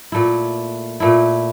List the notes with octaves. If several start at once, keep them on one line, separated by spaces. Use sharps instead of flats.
A#2 A3 E4
A#2 A3 E4